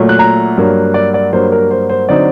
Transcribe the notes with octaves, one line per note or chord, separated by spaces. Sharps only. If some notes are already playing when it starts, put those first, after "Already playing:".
Already playing: A#2 F#3 A3
F#6
A#5
G2 F#3 A#3
D5
D5
G2 F#3 A#3 C5
A#4
C5
C5
D3 F#3 C4 D#4 D5